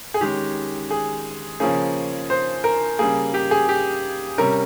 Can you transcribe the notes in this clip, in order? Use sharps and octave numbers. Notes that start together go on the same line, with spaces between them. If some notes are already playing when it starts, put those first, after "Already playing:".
G#4
D#3 G#3 C#4 G4
G#4
C#3 F3 A#3 C#4 G#4
C5
A#4
C#3 G3 A#3 G#4
G4
G#4
G4
C3 G3 C#4 A#4